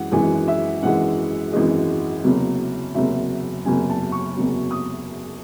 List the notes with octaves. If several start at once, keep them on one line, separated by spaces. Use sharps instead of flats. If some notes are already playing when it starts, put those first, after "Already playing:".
Already playing: F#2 E3 G#3 F#5
G#1 F#2 E3 G#3 G#5
E5
G#1 F#2 E3 G#3 F#5
G#1 F#2 E3 G#3 D#5
F#1 E2 C3 F#3
F#1 E2 C3 F#3 E5
F#1 E2 C3 F#3 G#5
A5
C#6
F#1 E2 C3 F#3
D#6